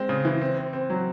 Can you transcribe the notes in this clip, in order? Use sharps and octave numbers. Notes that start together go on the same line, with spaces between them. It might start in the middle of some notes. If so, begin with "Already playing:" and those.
Already playing: G#3 C4
C#3
E3
C4
C4
C4
F#3